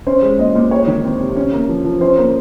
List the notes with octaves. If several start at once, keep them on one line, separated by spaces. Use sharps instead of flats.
C#4 C5
G#3
A#2 D#5
A#2
G#3 C#5
D#3
C4
C3
C#4
A#3
F3
F3
C#4 C5
A#3